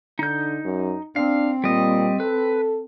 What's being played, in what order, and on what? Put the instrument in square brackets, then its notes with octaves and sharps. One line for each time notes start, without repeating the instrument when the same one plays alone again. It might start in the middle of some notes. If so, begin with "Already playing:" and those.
[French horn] D3 [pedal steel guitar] D#4 G6
[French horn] F#2
[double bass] C4 [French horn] D4 [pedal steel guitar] F5
[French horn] A#2 [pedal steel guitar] G3 D#5
[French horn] A4 [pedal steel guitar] B4